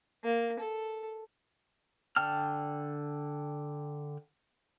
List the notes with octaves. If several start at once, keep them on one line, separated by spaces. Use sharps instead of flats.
A#3
A4
D3 D5 G5 A5 F6